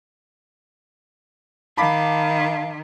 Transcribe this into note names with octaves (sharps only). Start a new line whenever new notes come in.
D#3 F5 A5 B5 D6